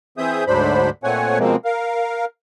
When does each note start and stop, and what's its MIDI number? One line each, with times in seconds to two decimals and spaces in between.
0.18 0.44 52
0.18 0.44 60
0.18 0.44 68
0.18 0.44 76
0.18 0.44 87
0.18 0.44 91
0.47 0.90 38
0.47 0.90 44
0.47 0.90 54
0.47 0.90 62
0.47 0.90 72
0.47 0.90 83
1.04 1.39 46
1.04 1.39 57
1.04 1.39 60
1.04 1.39 73
1.04 1.39 78
1.04 1.39 80
1.39 1.56 47
1.39 1.56 53
1.39 1.56 56
1.39 1.56 58
1.39 1.56 60
1.65 2.25 70
1.65 2.25 77